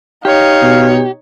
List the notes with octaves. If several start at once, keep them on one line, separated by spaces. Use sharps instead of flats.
D#4 G4 C#5 F5
B2